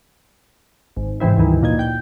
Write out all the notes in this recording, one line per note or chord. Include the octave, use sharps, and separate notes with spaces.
G#1
G#2 C3 E3 C4 E4
D2 G2 D#3 E3
A#1 A#2 D#4 G#6
G5 G6